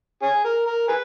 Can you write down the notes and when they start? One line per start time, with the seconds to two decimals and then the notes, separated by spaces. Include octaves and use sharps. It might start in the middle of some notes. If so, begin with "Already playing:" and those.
0.22 C#4 G#4
0.45 A#4
0.67 A#4
0.88 G#4 B4